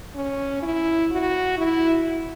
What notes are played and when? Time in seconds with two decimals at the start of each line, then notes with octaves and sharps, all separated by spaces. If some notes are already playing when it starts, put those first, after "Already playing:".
0.15 C#4
0.63 E4
1.11 F#4
1.58 E4